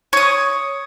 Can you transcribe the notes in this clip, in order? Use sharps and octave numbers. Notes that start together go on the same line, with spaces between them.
C#5 D#6